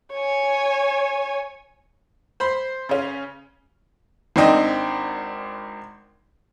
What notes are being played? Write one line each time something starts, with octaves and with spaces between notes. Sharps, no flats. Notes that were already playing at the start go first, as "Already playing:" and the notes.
C#5 G#5
C5 B5 C6
C#3 C#4
G#1 D#3 C4 D4 D#5 G5